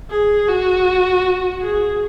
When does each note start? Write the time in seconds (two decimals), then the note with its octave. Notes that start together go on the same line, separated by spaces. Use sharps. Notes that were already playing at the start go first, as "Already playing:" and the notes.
0.10 G#4
0.48 F#4
1.62 G#4